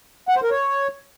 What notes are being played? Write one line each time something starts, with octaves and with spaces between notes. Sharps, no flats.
F#5
C5
A#4
C#5